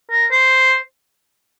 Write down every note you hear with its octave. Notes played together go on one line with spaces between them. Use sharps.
A#4
C5